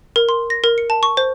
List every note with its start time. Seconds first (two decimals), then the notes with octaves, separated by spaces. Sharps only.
0.16 A#4
0.29 C6
0.50 A#6
0.64 A#4
0.78 C#7
0.90 A5
1.03 C#6
1.17 C5